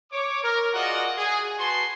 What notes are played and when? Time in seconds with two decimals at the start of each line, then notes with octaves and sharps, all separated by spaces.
0.12 C#5 D6
0.43 A#4
0.74 F4 F#4 G#4 D5 D#5 F#5
1.16 G#4
1.58 F#4 B4 G#5 A5 C6